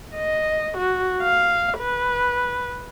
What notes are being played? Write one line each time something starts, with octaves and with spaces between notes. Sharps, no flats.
D#5
F#4
F5
B4